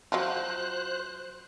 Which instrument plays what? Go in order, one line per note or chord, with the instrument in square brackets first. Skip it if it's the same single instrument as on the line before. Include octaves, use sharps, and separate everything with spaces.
[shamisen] F3 F#3 [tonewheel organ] C5 F#6